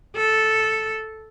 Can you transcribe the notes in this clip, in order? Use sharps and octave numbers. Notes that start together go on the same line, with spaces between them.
A4